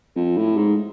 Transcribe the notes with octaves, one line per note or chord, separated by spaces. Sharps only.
F2
A2
G#2